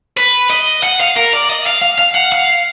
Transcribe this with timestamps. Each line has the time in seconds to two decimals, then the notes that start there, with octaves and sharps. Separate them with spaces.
0.17 B4
0.50 D#5
0.83 F#5
1.00 F5
1.16 A#4
1.33 D5
1.50 D#5
1.66 F5
1.82 F5
1.98 F5
2.15 F#5
2.32 F5